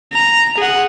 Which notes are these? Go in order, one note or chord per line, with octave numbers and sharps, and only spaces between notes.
A#5
G#4 F#5